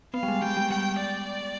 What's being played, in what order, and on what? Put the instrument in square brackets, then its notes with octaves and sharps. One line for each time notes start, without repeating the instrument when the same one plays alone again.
[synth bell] B3 [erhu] F5
[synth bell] G3
G#3
[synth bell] G3 [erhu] G5
[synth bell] G3
[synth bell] G3 [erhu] G5
[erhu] D5